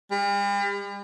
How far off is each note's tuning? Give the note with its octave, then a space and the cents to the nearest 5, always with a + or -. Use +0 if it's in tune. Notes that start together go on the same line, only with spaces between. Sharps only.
G3 +45